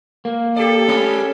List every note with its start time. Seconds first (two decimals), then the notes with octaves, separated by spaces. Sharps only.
0.25 A#3
0.56 G4 A4 D5
0.88 G3 G#3 C#4